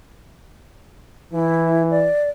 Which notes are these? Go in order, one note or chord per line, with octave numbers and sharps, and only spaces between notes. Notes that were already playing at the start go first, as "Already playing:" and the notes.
E3 E4
D5